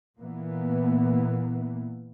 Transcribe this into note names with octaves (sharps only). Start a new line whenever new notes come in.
A#2 E3 A#3 B3